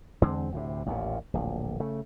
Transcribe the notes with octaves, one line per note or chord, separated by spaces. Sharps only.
E2 D3 G#3 C4
D2 A2 C3
A1 D#2 A#2
D1 A#1
C#3 A3